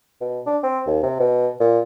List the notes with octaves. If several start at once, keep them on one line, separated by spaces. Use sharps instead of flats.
B2
D4
C4
D#2
C3
B2
A#2